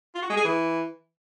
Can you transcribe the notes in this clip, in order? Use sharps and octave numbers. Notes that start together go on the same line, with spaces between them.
F4
F#4
G#3
G#4
E3